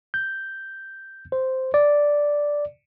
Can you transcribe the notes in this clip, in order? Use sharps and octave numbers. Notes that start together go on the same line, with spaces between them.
G6
C5
D5